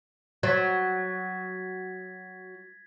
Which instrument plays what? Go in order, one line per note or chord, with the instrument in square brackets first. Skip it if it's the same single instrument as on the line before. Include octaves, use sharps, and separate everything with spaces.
[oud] F#3 [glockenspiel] G#6 A6 B6